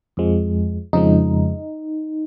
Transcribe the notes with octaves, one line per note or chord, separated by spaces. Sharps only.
F2 F3 G#3
F2 C#3 F3 G#3 D#4